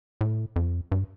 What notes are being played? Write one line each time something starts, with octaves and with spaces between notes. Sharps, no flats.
A2
F2
G2